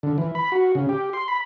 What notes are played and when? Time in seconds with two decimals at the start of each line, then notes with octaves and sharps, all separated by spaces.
0.03 D3
0.18 E3
0.35 B5
0.52 F#4
0.75 C#3
0.89 G4
1.13 C6
1.28 B5